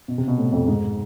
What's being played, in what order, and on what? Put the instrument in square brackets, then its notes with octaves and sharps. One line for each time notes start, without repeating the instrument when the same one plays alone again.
[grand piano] B2
C3
B2
A2
F2
G#2